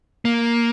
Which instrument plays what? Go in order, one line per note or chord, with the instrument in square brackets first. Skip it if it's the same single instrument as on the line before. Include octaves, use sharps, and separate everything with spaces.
[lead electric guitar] A#3